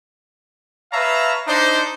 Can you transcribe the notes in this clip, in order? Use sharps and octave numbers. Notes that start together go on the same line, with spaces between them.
B4 C#5 E5 F5 A5 A#5
D4 D#4 C5